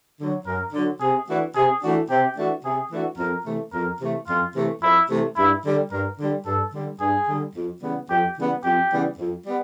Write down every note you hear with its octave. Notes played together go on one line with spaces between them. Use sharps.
D3 F#3
F#2 A#4
D3 F#3
C3 G#4
E3 A3 D4 F#4
C3 G#4
E3 A3 D4 F#4
C3 G4
E3 A3 D4 F#4
C3 G#4
E3 A3 D4 F#4
F2 A#4
C3 E3 A3
F2 A#4
C3 E3 A3
F2 F4
C3 E3 A3
F2 E4
C3 E3 A3
G2 E4
D3 G3
G2 A#4
D3 G3
G2 A4
D3 G3
G2 G#4
D3 G3
F2
C#3 E3 G3 B3
F2 G4
C#3 E3 G3 B3
F2 G4
C#3 E3 G3 B3
F2
G3 B3